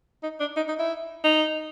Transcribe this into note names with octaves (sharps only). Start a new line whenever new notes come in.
D#4
D4
D#4
D#4
E4
D#4